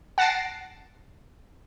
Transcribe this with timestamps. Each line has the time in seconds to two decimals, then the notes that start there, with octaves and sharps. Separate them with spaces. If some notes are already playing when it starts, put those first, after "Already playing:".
0.18 F#5 A5 A6 A#6 C7 D7